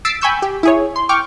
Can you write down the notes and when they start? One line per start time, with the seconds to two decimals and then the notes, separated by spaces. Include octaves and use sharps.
0.05 E6 A6 B6 C7 D7
0.21 G5 G#5 B5 C#6 E6 G6
0.42 G4
0.63 E4 G#4 C#5
0.96 C6
1.09 G5 C#6 D6 F6